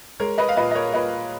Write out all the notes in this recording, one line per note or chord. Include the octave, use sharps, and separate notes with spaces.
G#3 A#4 C#5
B4 D#5
F5
A#2 B4 D#5
D#5
A#4 C#5
A#2 B4 D#5